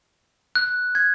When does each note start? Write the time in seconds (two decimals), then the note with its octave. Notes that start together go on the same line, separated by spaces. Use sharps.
0.55 F#6
0.95 G#6